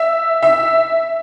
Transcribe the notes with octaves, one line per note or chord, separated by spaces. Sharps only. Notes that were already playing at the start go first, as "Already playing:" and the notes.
Already playing: E5
E5